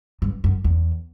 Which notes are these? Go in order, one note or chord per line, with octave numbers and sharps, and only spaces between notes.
G2
F#2
E2